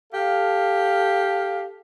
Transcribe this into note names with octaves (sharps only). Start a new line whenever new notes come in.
G4 A4 F5